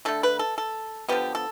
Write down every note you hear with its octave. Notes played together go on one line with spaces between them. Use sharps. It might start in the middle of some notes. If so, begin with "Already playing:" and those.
D3 A3 A4
B4
A4
A4
D3 F3 B3 G4
A4